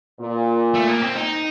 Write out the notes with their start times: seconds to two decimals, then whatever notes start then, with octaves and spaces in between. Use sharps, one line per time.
0.20 A#2
0.75 A3
0.88 A#3
1.02 C4
1.15 D#4